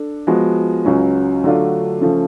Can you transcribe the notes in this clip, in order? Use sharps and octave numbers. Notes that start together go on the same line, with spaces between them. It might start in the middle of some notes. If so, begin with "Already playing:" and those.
Already playing: D4 A4
F3 G#3 B3 F#4
C#2 C#3 F#3 C#4
D3 F#3 A3 D4 F4
C#3 F3 A3